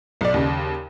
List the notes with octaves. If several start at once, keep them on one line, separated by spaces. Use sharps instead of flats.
B1 D5
D#2 C#3